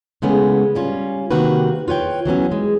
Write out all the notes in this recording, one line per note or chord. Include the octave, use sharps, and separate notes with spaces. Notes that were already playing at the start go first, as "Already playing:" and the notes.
C#3 E3 G#3 A3 B3 C#4
G3 C#4 F4
C3 D#3 A#3 F#4 G4 B4
F4 B4 C#5 G5
E3 F#3 B3 C#4
G#3